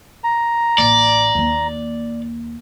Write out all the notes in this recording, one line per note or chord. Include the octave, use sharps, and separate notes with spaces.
A#5
A1 A#3 D5
D#2 A#3